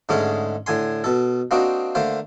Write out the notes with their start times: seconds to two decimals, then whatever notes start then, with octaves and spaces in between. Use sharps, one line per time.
0.09 G#2 D3 G#3 A3 C#4 D#4
0.66 A2 D3 G#5 C6
1.04 B2 A4
1.51 A#3 C4 D4 D#4 F#4
1.95 D3 A3 A#3 C5